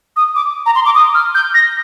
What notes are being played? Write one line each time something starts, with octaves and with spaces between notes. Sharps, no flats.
D#6
D6
A#5
C6
D6
D#6
F6
G6
A#6